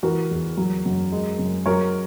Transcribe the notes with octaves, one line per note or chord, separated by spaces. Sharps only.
E3 F#4 A#4
E2
F#3
F#2
G#3
F#2
F#3 A#4 C#5